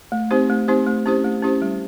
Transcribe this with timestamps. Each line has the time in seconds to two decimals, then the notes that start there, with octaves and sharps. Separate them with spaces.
0.12 A3
0.31 C4 D#4 G4 C5
0.50 A3
0.68 C4 D#4 G4 C5
0.86 A3
1.06 C#4 E4 G4 C5
1.24 A3
1.43 C#4 E4 G4 C5
1.62 G3